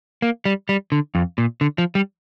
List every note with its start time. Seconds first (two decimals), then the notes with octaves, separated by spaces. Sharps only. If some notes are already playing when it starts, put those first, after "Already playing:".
0.22 A#3
0.45 G3
0.69 G3
0.92 D3
1.15 F2
1.38 A#2
1.61 D3
1.78 F3
1.95 G3